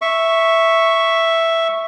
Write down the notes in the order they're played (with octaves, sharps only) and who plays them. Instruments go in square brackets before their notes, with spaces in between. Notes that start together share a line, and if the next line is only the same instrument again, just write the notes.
[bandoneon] E5 C#6